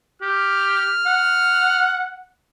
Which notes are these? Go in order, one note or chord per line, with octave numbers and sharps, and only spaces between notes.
G4 F6
F#5